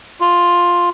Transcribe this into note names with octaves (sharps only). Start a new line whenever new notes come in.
F4